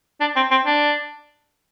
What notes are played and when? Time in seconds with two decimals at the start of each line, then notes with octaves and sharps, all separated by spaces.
0.21 D4
0.36 C4
0.51 C4
0.65 D4